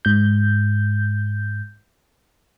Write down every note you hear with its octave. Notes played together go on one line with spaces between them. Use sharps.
G#2 G6